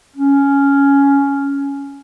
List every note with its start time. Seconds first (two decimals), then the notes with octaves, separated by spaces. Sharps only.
0.16 C#4